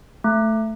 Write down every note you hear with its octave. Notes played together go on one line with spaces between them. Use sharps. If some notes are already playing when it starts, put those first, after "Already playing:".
A3